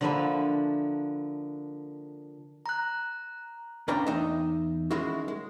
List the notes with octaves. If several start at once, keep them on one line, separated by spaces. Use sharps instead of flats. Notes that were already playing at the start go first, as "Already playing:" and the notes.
D3 F3 A#3 D4 B4 E5
A#5 F#6
C#2 C#4 D4 B4 G5 A#5
E2 D#4 D#5 E5
D#3 G#3 C#4 E4 F#4
G#3